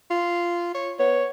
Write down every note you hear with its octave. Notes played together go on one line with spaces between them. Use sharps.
F4
C#5
B3 C#5